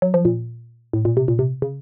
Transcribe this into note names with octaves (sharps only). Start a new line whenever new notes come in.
F#3
F3
A#2
A2
A#2
C3
A#2
C3
C#3